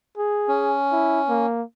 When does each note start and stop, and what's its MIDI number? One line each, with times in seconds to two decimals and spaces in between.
0.18 0.77 68
0.48 1.46 61
0.92 1.20 64
1.29 1.63 58